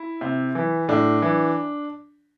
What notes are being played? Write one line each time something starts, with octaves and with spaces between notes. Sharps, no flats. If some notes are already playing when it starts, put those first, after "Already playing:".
Already playing: E4
C3
E3
A2 D4
E3